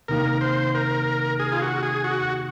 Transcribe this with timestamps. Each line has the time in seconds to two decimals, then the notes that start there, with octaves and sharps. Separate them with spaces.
0.08 C3 D#3 A#3 A#4
0.41 C5
0.75 A#4
1.40 G#4
1.52 F4
1.62 F#4
1.83 G#4
2.04 F#4